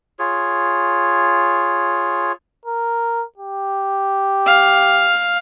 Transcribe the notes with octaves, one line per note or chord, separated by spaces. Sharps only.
F4 G#4 C#5
A#4
G4
F5